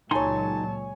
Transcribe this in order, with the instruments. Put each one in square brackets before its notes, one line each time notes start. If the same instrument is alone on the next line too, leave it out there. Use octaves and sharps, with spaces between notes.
[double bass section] C#2 A#2 F#3 [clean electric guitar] D#4 C6 [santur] C#5 G#5 [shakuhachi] A5